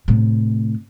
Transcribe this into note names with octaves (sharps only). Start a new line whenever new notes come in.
A2 C3